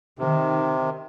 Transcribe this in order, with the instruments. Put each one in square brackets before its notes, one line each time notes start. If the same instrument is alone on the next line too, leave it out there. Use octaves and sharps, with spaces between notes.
[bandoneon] C3 [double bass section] D#3